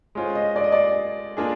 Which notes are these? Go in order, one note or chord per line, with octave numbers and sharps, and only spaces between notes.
G#3 C#4 F4 G#4 C5
D#5
D5
D#5
D5
A#3 D4 F4 G#4